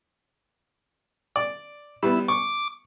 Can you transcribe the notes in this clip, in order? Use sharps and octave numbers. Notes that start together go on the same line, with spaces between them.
D5
G3 B3 E4
C#6 D6